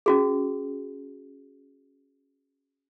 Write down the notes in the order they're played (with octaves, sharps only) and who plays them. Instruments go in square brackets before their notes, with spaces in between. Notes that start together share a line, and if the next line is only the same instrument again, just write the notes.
[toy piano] C#4 F#4 G#4